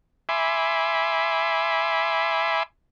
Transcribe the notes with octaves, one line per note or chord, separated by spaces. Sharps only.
E5 G#5 B5 C6 D6